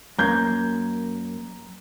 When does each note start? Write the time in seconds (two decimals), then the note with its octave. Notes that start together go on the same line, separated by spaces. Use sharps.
0.18 F#2 A#3 A#5 G6 G#6